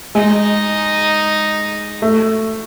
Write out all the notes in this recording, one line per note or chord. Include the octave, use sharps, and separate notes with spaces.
G#3 D#4
A3